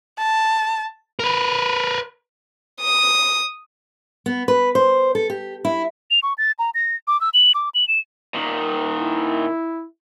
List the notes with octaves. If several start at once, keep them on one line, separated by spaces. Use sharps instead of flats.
A5
A#4 B4
D#6
B3
B4
C5
A4
G4
E4
F7
C#6
A6
A#5
A#6
D6
E6
F#7
D6
F#7
E7
A#2 D#3
E4